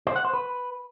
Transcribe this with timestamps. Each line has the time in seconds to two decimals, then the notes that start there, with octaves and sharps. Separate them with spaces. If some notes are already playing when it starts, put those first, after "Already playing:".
0.07 C5
0.16 F#5
0.25 C5
0.33 B4